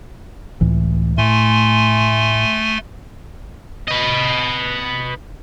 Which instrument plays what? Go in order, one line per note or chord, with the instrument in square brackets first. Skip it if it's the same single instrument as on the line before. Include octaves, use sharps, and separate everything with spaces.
[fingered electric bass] C#2 A2 E3
[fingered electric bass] A2 [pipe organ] A3 G#5 C6
[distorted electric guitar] B4 D#5